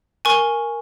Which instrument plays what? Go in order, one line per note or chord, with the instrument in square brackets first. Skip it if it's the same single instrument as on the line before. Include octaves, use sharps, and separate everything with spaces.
[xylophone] A#4 G#5 C#6